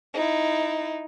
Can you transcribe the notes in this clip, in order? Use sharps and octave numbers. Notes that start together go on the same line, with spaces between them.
D#4 E4